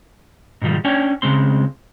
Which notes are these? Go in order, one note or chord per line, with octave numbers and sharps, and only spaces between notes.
G#2 B2 D#3 F3 G3
C#4 D4 C#5 D5 G5 G#5
C#2 G#2 C#3 G#3 C4 C6